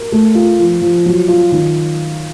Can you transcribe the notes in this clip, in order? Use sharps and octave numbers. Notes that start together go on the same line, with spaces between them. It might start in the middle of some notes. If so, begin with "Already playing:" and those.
Already playing: A#4
A3
F4
F3
F3
F#3
F4
D#3